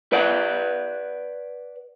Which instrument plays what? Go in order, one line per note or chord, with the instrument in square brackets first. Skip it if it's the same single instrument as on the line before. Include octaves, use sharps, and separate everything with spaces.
[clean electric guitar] B4 D5 F#5